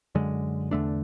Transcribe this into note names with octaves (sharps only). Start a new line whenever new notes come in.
F#2 D3 G#3
E2 D3 A3 D4